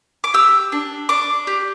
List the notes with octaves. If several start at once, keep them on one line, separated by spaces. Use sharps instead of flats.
D6
G4 E6
D4
D4 D6
G4